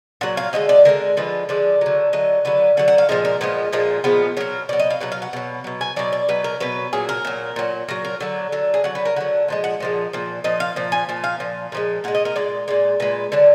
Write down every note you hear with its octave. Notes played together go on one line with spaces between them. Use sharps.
A#2 F#3 F#5
F5
D3 F3 G#3 D#5
D5
D3 F3 G#3 A#4
D3 F3 G#3 B4
D3 F3 G#3 D5
D3 F#3
D3 F#3 D#5
D3 F#3 B4
D3 F#3 F#5
F#5
F5
A#2 F3 G#3 A#4
A#4
A#2 F3 G#3 B3
A#2 F3 G#3 A#3
A#2 F3 G#3 B3
B2 F#3 A#4
B2 F#3 D5
D#5
F5
B2 F#3 F#5
F5
F#5
B2 F#3
B2 F#3
G#5
B2 F#3 D5
D5
B2 F#3 B4
A#4
B2 F#3 B4
A#2 F#3 G#4
A#4
A#2 F#3
A#2 F#3
A#2 F#3 A#4
A#4
D3 F#3 D5
D3 F#3
G#4
D3 F#3 F#5
B4
A#4
D3 F#3 F#5
A#2 F3 G#3
F#5
A#2 F3 G#3
A#2 F3
A#2 F3 D#5
F5
A#2 F3
G#5
A#2 F3
F5
A#2 F3
A#2 F3 G#3
A#2 G#3 F#5
D#5
A#4
A#2 G#3 D5
A#2 G#3 D5
A#2 G#3 B4
D3 F#3 D4